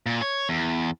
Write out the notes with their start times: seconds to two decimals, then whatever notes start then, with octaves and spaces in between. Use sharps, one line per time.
0.06 A#2
0.22 C#5
0.49 E2